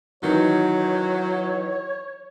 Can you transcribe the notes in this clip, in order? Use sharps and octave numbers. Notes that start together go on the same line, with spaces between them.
D#3 E3 F#3 D#4 C#5